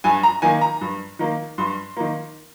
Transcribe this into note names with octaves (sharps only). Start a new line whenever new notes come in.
G2 G#5
A#5
D#3 A#3 G#5
A#5
G2
D#3 A#3
G2 C6
D#3 A#3